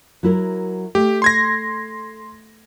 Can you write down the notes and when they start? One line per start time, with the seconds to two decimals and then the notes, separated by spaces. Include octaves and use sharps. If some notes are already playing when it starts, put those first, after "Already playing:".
0.23 F#3 E4 A#4
0.95 A3 G4
1.22 C6 G#6 A#6